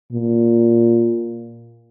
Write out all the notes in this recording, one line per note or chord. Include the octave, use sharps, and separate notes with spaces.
A#2